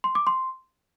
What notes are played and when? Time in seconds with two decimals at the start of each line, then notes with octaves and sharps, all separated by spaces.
0.04 C6
0.15 D6
0.27 C6